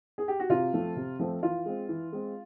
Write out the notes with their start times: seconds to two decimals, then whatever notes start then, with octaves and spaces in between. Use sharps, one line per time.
0.18 G#4
0.28 G4
0.40 F#4
0.49 C3 F4
0.74 F3 A3 C4
0.96 C3
1.19 F3 A3 C4
1.42 E3 F4
1.66 G#3 C4
1.88 E3
2.12 G#3 C4